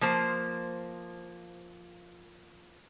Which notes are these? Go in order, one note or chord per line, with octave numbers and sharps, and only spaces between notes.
F3 A#3 C5